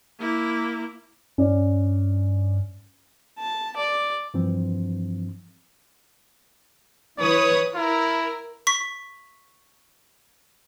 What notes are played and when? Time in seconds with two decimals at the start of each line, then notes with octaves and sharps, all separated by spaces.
0.19 A#3 E4
1.38 G2 C#4 D5
3.39 A5
3.77 D5
4.34 G2 E3 F3 C4
7.19 E3 B4 C#5 D#6
7.76 E4 A#4
8.67 C#6 B6